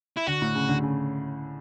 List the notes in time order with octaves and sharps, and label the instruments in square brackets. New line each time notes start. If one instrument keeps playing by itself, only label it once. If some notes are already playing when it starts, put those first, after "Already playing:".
[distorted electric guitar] E4
[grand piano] D3 [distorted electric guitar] F#4
[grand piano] A2
C#3
D3
C#3